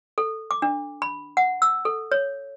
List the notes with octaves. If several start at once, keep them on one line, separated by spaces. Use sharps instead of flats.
A4
D6
D4
B5
F#5
E6
A4
C#5